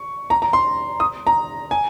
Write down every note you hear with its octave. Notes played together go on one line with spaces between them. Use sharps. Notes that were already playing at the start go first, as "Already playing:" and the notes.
Already playing: C#6
A#5
A#5
C6
D#6
A#5
G#5